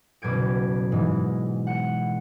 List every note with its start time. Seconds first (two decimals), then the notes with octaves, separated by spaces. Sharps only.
0.22 F#1 B2 G3 G#6 D7
0.92 G#2 E3 G#3
1.67 F#5